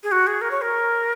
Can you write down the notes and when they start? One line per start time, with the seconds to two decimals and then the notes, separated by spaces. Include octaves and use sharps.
0.03 G#4
0.12 F#4
0.27 G#4
0.41 A#4
0.51 C#5
0.62 A#4